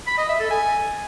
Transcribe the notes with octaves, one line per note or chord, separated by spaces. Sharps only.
B5
D#5
E5
A4
G#5